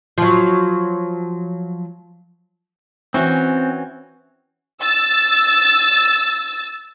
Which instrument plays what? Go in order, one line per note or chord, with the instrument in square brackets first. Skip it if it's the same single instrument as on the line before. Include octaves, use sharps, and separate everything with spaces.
[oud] F3 F#3
[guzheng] E3 C#4 F#4 [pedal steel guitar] C4
[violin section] E6 A6